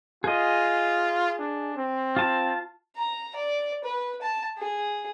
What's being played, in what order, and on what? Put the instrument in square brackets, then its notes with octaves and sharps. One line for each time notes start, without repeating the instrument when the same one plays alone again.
[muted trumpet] F4 [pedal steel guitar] G#4 D#5
[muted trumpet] D4
C4
[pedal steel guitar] F4 A5
[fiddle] A#5
D5
B4
A5
G#4